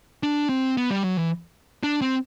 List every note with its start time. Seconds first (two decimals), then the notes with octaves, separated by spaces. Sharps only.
0.23 D4
0.49 C4
0.77 B3
0.90 G3
1.04 F#3
1.17 E3
1.83 D4
2.02 C4